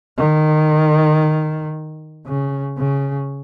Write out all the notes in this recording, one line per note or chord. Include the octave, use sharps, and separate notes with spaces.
D#3
C#3
C#3